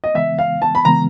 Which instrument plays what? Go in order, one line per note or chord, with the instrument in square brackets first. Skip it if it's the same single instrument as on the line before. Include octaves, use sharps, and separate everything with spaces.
[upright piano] D#5
[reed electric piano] C#3 E3 G#3 B3 [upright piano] E5
[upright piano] F5
A5
B5
[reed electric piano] C#3 E3 G#3 B3 [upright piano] A#5